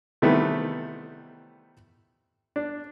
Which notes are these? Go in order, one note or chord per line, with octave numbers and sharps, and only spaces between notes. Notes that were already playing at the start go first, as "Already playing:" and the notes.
C3 D#3 E3 G3 A3 B3
D4